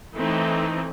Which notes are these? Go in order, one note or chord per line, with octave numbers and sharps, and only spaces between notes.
E3 A3 C4 D#4